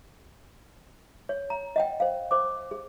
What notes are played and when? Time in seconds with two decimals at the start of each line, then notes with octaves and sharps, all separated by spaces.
1.29 C#5
1.50 A#5
1.76 D#5 F#5 G5
2.00 C5 F5
2.31 C5 D6
2.71 G#4